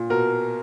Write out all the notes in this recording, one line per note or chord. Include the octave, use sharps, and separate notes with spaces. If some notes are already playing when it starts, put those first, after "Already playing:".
Already playing: A#2
B2 A#4